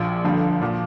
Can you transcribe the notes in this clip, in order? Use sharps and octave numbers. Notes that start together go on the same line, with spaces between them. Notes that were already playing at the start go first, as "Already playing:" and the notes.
Already playing: A#1 A#2 F3
G1 G2 D3 F3
A#2 F3